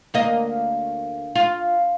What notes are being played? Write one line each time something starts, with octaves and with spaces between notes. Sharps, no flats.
D2 A#3 D#5
F4